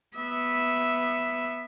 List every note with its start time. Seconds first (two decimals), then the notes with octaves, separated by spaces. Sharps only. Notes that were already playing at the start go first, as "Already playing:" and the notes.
0.17 B3 E5